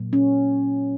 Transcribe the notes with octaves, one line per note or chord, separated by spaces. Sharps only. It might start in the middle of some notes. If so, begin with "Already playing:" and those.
Already playing: A#2 F#3 A#3
C#4